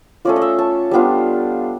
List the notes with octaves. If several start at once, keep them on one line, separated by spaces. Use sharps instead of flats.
A3 C#4 F4 D5
D#5
E5
A5
G3 B3 D4 F4